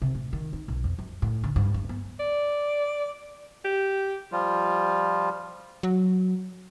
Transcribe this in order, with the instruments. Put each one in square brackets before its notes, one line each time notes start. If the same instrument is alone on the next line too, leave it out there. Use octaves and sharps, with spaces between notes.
[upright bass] C3
A2
D#3
D#4
B1
F2
F#2
A2
D3
G2
G2
B3
[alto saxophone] D5
G4
[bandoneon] F3 G3 F4
[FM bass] F#3